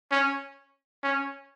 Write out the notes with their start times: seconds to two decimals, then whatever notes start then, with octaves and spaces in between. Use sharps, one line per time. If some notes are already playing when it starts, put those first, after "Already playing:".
0.11 C#4
1.03 C#4